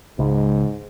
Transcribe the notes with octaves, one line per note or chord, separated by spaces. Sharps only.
C#2 G#2